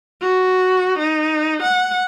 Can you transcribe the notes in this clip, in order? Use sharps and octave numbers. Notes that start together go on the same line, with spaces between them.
F#4
D#4
F#5